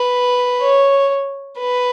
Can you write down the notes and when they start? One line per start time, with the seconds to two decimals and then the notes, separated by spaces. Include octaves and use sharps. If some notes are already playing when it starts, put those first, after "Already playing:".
Already playing: B4
0.61 C#5
1.59 B4